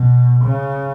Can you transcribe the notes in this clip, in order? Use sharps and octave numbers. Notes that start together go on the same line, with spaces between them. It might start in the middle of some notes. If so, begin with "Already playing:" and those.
Already playing: B2
C#3